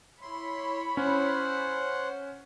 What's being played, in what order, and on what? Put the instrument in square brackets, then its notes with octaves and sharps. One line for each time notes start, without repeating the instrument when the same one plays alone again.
[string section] E4 C#5 B5 [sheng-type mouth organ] C6
[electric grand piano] C#4 [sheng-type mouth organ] C5 F#5